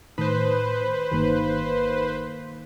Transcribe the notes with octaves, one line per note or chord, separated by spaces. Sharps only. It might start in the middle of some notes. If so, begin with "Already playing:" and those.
A2 D#3 B4 C5
G1 D#3 A#3